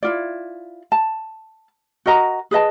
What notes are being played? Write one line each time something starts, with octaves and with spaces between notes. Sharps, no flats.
E4 F4 D5
A5
F#4 A#4 D#5 A#5
G#4 B4 D#5 A5